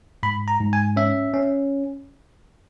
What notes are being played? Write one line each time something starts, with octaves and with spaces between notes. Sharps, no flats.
G#2 B5
A#5
G#2
G#5
C#4 E5
C#4